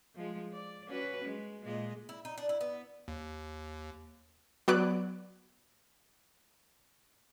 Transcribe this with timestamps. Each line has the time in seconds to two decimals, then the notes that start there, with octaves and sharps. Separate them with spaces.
0.15 F3 G#3
0.53 D5
0.87 C#4 F#4 B4
1.24 G#3
1.63 A#2 G#3 D#5
2.09 E4
2.25 D#4
2.38 D4
2.49 E4
2.61 B3
3.08 D#2
4.68 F#3 B3 D5 F#6 D7